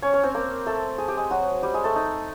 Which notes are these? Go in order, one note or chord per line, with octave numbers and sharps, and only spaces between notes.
C#4 C#5
C#4 C#5
C4 C5
A#3 A#4
A3 A4
G#4
G4
G#3 G#4
F#3 F#4
G3 G4
G#3 G#4
A3 A4
D#4